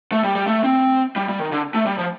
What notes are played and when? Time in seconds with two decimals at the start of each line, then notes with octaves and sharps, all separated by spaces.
0.12 A3
0.24 G3
0.36 G3
0.47 A3
0.64 C4
1.16 G3
1.29 G3
1.40 D#3
1.52 D3
1.74 A3
1.86 G3
1.98 F3